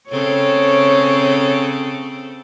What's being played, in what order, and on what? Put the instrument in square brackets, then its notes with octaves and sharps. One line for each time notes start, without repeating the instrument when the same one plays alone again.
[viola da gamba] C#3 C4 A4 [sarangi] C#5